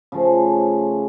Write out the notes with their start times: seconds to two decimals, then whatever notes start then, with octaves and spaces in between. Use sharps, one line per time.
0.12 C#3 F3 A3